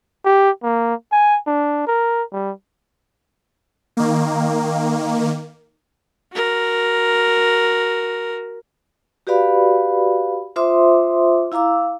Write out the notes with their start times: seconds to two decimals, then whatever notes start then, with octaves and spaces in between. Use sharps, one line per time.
0.25 G4
0.63 A#3
1.12 G#5
1.47 D4
1.87 A#4
2.33 G3
3.97 D#3 A#3
6.33 F#4 A#4
9.27 F#4 G4 B4 D5 F5 B5
10.56 F4 C5 E5 C6 D6 D#6
11.52 E4 F5 A#5 D6 E6